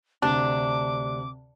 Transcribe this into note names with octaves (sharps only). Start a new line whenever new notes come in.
D2 C3 D4 D6